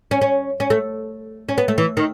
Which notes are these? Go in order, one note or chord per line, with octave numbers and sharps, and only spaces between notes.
C#4
C#4
C#4
A3
C#4
B3
A3
E3
D#3